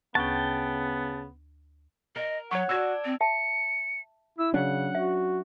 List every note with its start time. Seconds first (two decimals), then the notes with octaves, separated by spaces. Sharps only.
0.15 D2 C#3 B3 G5 A5 C#6 F#6
2.16 A#4 D#5
2.51 F#3 C#5 F#5 C#6
2.69 D4 F#4 E6 G#6
3.05 C4
3.21 E5 A5 C#7
4.38 E4 E6
4.54 C#3 F#3 C#4 D4 F#5
4.95 F#4 E5